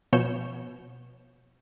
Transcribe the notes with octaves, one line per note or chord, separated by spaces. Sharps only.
B2 F3 C#5 G6 E7